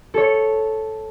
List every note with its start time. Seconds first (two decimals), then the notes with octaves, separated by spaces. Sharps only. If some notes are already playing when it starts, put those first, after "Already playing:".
0.14 A4 C#5